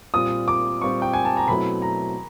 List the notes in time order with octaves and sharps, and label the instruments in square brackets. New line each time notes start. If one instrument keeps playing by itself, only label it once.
[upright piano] A#2 G3 C4 F4 [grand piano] D#6
[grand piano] D6
[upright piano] A#2 G3 C4 F4 [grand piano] C#6
[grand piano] G5
G#5
A5
A#5
[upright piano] B2 F#3 A3 C4 E4 [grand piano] B5
[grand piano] A#5